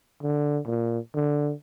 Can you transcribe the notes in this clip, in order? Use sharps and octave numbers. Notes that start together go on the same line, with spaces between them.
D3
A#2
D3